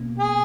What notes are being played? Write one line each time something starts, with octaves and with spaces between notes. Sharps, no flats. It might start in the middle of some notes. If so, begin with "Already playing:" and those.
Already playing: B2 A#3 C#4
G#4